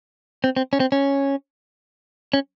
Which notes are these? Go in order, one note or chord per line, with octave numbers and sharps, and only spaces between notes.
C4
C4
C#4
C4
C#4
C#4